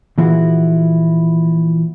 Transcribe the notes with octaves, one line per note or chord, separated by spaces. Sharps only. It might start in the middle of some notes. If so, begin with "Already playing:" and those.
A#2 E3 F3 E4 F#4 G#4